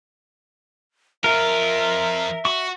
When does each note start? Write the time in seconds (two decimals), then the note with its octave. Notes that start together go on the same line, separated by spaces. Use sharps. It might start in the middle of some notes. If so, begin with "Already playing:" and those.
1.24 F2 F4 A#4 E5
2.45 F#4 C#6